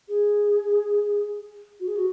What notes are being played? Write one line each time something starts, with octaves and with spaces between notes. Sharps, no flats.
G#4
F#4
G#4
F#4